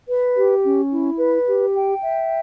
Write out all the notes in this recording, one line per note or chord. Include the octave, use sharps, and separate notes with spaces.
B4
G4
C#4
E4
B4
G4
G5
E5